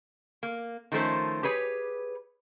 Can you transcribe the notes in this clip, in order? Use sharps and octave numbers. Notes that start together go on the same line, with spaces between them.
A#3
D#3 F3 A3 C#4 C5
G4 G#4 B4 C#5